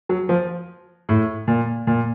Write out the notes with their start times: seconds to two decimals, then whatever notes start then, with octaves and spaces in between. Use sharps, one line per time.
0.09 F#3
0.29 F3
1.09 A2
1.48 A#2
1.87 A#2